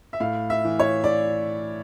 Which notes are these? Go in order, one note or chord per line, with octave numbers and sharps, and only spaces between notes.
E5
A2 F5
E5
E3
C#5
D5